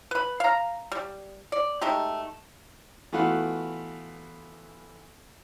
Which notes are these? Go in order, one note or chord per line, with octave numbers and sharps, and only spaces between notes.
B4 B5
F5 A#5
G3
D5
G#3 A3 D#4 G4
E3 A3 B3 F4 F#4